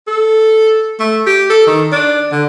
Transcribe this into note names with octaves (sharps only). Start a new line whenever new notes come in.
A4
A3
G4
A4
D#3
D4
D3